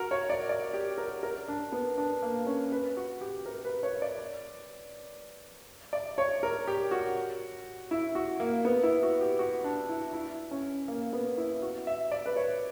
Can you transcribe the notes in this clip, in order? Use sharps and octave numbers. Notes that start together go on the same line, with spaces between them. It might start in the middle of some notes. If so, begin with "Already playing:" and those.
Already playing: F#4 A#4
C#5
D5
D5
G4
A#4
A#4
D4
B3
D4
A#3
C#4
B4
F#4
G4
A#4
B4
C#5
D5
D5
C#5
A#4
G4
F#4
E4
F#4
A#3
B3
E4
F#4
G4
F#4
D4
E4
E4
C#4
A#3
B3
E4
F#4
E5
D5
B4
C#5